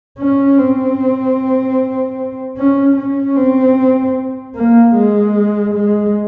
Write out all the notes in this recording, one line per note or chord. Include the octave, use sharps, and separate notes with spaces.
C#4
C4
C#4
C#4
C4
A#3
G#3
G#3